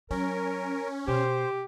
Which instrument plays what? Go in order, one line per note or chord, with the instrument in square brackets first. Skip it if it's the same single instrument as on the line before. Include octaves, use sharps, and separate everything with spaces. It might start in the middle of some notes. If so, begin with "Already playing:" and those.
[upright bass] F#3 [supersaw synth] C#4 [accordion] A#4
[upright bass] B2 [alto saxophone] G4 [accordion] C5